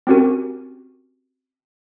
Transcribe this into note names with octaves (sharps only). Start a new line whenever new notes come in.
C4 C#4 F#4 G4 A#4